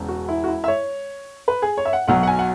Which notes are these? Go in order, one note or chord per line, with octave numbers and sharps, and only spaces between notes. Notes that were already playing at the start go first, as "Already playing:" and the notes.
Already playing: E1 E2 C#3
F#4
E4
F#4
E4
E5
C#5
B4
G#4
C#5
E5
F#5
B1 B2 F#3 F#5
F#5
G#5
F#5